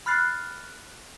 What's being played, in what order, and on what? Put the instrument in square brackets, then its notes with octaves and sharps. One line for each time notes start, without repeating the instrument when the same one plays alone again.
[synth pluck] B5 F6 F#6 A6 C7